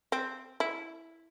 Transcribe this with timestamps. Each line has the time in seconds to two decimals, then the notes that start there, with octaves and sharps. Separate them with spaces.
0.12 C4
0.60 E4